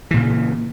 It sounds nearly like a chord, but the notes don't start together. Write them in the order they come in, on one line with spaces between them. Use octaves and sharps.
E3 A#2 C#3